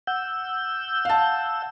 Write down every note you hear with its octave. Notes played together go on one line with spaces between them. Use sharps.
F#5 E6 G6
F5 A5